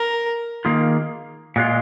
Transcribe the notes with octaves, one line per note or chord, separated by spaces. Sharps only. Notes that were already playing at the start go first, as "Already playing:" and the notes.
Already playing: A#4
D#3 A#3 F4 G#4
A#2 G#3 F4